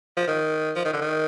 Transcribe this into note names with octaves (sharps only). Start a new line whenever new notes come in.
F3
D#3
F3
D#3
D3
D#3